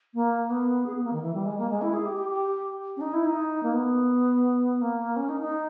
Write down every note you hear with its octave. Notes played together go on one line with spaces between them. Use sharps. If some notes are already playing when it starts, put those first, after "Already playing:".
A#3
B3
G#4
B3
A#3
D#3
E3
G3
G#3
A#3
G#3
E4
G#4
G4
G4
G4
C#4
D#4
E4
D#4
A#3
B3
A#3
C#4
D#4
D#4